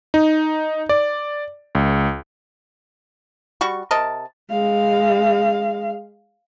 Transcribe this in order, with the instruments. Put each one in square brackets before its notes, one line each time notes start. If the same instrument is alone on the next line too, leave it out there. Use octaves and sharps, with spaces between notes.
[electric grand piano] D#4
D5
C#2
[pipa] G3 F#4 C#6
C3 A#4 D#5 A5
[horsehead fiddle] G#3 F5